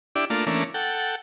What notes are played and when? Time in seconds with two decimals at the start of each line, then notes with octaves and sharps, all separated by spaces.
0.16 D4 E4 G4 D5
0.30 A3 A#3 D4 F4
0.47 E3 A3 A#3 C#4 D4
0.74 A4 F#5 G5